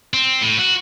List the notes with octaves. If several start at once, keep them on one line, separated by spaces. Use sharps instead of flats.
C4
A2
F#4